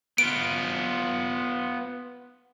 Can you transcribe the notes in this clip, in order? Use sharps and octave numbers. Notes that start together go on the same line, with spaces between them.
B3 F4 D7